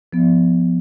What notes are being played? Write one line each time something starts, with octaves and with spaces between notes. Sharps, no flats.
F3 B3